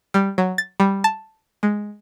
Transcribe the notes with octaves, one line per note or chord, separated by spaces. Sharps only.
G3
F#3
A6
G3
A5
G#3